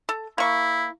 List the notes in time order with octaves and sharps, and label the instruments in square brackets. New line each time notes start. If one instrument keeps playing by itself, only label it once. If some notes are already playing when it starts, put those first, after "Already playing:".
[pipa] A4
[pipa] A#3 C#6 [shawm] E4